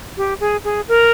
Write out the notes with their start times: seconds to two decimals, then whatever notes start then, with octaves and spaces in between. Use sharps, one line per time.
0.17 G4
0.40 G#4
0.64 G#4
0.88 A#4